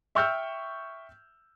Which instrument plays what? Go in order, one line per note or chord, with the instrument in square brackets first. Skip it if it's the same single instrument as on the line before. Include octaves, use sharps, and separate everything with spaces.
[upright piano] E5 G5 C#6 E6 F6 G6